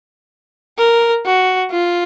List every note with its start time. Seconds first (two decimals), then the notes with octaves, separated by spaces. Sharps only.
0.78 A#4
1.26 F#4
1.71 F4